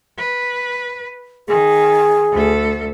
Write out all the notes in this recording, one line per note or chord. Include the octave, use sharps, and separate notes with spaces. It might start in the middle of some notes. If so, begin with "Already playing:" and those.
B4
D#3 G#4
D2 A4